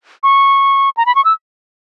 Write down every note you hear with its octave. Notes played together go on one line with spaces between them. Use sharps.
C#6
A#5
B5
C#6
E6